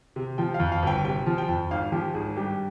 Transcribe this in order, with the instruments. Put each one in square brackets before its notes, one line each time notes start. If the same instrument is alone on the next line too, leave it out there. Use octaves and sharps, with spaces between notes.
[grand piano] C3
F3 G5
F5
F2
F5
G1 G5
C3 G5
F3
G5
F2
G#1 F5
F3 G4
G#1 G#4
G2 G4